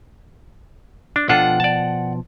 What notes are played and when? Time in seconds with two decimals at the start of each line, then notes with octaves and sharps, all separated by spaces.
1.16 D4
1.29 B2 F3 D4 F4 A4 F#5 G5
1.60 D5 A5